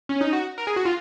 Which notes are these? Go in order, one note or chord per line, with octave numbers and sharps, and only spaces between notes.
C#4
D#4
F#4
A#4
G#4
F#4
F4